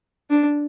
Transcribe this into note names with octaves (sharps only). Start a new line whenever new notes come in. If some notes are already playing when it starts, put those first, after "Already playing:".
D4